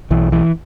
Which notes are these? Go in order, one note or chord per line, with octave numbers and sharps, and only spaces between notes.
B1 E3
E3